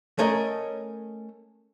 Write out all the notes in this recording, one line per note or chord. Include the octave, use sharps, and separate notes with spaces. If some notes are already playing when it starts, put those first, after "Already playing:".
A3 C#4 A#4 D#5